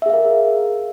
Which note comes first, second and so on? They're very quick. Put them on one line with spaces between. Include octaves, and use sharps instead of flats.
E5 G#4 F5 A#4